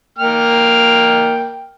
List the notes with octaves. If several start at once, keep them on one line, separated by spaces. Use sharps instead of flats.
A#3 G5 F6